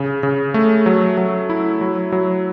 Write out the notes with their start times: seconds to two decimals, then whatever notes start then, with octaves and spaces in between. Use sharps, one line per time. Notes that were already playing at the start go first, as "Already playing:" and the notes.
Already playing: C#3
0.23 C#3
0.54 A3
0.86 F#3
1.17 F#3
1.49 E4
1.81 F#3
2.12 F#3